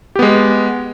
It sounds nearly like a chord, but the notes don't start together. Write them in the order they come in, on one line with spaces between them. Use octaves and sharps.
G4 B3 G#3